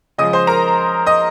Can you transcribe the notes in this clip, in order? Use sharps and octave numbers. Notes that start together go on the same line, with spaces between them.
C#3 F3 G#3 D#5 D#6
C5 C6
A#4 A#5
D#5 D#6